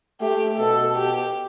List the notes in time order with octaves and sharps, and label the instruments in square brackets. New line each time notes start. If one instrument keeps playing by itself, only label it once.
[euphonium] A3 [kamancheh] G4
[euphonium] B2 [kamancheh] A4
[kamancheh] G4